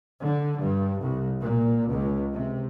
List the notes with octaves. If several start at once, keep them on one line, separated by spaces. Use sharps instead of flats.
D3
G2
C2
A#2
C#2
C3